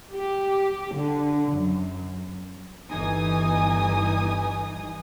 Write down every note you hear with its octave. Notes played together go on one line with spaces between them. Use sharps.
G4
D3
F#2
G1 E3 D#4 G#5 D#6